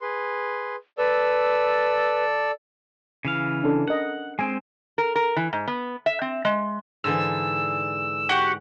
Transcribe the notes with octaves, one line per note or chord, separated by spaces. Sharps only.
G#4 B4 C6
A4 B4 D5 E6
C#3 E3 F5
C#4 D4 A4
A#4 D#5 F#5
G#3 C4 G#5
A#4
A#4
E3
G#2
B3
E5
C4
G#3
G#2 D3 E3 E6
F#4 G4 F#5